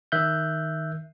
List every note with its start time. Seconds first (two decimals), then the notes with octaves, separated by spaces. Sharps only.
0.12 D#3 E5 F#6 G6